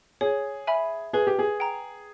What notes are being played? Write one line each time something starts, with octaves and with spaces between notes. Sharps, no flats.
G#4 C#5
E5 G#5 B5
G#4 B4
G4
G#4
G5 A#5